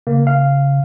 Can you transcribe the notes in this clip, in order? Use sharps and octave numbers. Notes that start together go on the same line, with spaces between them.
C#3 A#3
F5